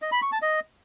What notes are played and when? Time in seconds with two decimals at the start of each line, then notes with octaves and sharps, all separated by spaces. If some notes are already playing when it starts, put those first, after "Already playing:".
0.02 D#5
0.12 B5
0.22 C#6
0.32 A5
0.42 D#5